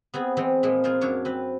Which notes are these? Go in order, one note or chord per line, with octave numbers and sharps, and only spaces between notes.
B3 C4 G#4
E3 G#3 C4
A#2 E3 F3 G#3
F4 G#4 A#4 C5
F#2 A#2 D4 C#5 A#5
C4 B4